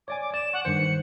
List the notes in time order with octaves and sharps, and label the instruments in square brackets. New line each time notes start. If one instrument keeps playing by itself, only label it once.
[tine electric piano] C#5 D5 G#5 [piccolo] D6
[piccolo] D6
[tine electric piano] D5 [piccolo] E7
[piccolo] F#5 [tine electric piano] C#6
[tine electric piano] G2 D#3 C5 [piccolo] C#7